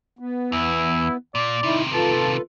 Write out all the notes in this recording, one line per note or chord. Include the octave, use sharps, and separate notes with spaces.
B3
E2 E4
A#2 D5
C3 D#3 D#4 E4
F4 A4 B4 A5